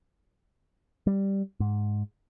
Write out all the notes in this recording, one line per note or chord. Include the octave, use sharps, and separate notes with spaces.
G3
G#2